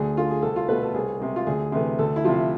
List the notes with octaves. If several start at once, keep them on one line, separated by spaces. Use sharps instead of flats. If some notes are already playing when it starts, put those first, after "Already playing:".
Already playing: D2 G#4
D3 A3 F4
G#4
C2 A4
F4
B2 A3 B4
A4
C2 G#4
C3 G#3
F4
D2 G#4
C3 E3 A3
D2 A4
E4
C3 F3 F4